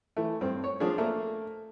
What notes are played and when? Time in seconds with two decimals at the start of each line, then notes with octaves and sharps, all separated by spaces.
0.17 E3 A3
0.41 G2 C4
0.64 C#5
0.80 F3 D4 F4 G#4
0.98 A3 A#3